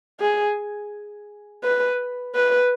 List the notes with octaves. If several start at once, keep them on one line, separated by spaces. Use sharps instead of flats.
G#4
B4
B4